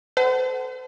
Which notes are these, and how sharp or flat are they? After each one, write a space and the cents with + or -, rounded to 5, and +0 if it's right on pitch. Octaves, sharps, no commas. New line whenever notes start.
A4 +0 C5 -40 F#5 +30